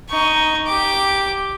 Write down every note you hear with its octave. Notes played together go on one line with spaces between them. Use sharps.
D#4 C#6
G4 D6